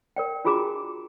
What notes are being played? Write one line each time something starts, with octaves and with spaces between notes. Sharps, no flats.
A#4 D5 G5
D4 F4 F#4 G#4 A#5 D6